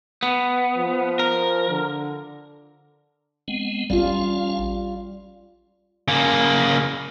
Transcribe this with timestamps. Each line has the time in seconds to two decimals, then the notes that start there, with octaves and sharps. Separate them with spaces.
0.23 B3
0.77 F3
1.19 A#4
1.70 D3
3.48 G#3 B3 C4
3.90 A1 G3 C#4 F4 F5
6.08 C#3 A#3